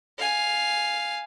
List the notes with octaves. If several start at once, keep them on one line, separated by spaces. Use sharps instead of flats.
F5 G#5